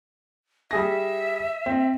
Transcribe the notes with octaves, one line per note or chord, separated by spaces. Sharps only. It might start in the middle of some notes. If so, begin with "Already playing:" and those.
G3 G#4 E5 A#6
C4